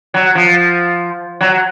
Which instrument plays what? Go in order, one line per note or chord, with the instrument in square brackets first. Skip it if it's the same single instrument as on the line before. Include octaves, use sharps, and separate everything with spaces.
[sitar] F#3
F3
F#3